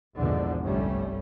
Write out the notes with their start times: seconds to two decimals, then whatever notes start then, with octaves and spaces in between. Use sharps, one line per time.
0.17 A#1 E2 G#2 B2 D3 F3
0.64 G1 C2 G3 A3 C#4